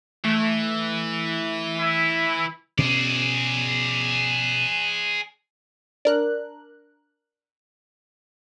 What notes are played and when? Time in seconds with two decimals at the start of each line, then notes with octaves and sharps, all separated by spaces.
0.25 E3 A3
1.79 E4
2.78 B2 C#4 G#4 D5
6.05 D4 A#4 F#6